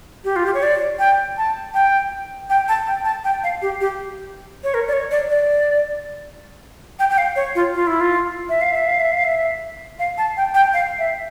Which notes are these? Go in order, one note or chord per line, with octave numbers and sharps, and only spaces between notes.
G4
F4
G4
C#5
D5
G5
A5
G5
G5
A5
G5
A5
G5
F5
G4
G4
C#5
A#4
D5
C#5
D5
D5
G5
G5
F5
C#5
F4
F4
E4
F4
E5
F5
E5
F5
E5
F5
E5
F5
A5
G5
G5
F5
E5